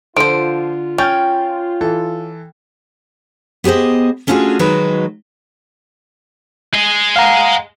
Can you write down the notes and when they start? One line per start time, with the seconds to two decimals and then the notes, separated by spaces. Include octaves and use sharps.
0.16 D3 F3 F4 C5 D7
0.98 C#4 G5 F6 G6 A6
1.81 E3 A4
3.64 B3 G4 G#4 C5 D#5
4.27 A3 C#4 D4 F4 F#4 G#4
4.59 D#3 F#3 G#3 D#4 F#4 B4
6.74 G#4 D#5
7.16 F5 F#5 A#5